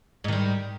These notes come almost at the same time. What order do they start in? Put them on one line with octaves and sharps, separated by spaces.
G#2 D#3 G3